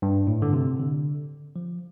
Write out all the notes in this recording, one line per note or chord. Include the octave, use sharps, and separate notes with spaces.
G2
A2
D3
C3
D3
F3